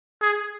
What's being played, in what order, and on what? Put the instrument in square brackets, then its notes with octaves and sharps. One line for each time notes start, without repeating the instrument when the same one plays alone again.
[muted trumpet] G#4